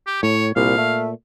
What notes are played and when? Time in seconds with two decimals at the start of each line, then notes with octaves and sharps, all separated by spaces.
0.07 G4
0.23 A2 C#5
0.56 C2 A#2 F5
0.77 A3